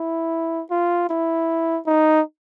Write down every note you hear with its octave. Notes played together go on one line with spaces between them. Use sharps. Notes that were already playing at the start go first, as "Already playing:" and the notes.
Already playing: E4
F4
E4
D#4